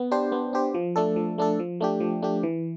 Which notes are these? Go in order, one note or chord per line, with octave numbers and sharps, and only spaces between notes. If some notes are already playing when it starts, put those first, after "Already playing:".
Already playing: B3
D4 G4 C5
B3
D4 G4 C5
F3
A3 D4 A4
F3
A3 D4 A4
F3
A3 D4 G4
F3
A3 D4 G4
E3